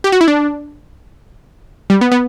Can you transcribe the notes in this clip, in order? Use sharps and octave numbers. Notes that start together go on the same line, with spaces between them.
G4
F#4
E4
D4
G3
B3
B3